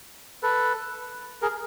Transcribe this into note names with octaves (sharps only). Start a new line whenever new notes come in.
A4 B4
G#4 A#4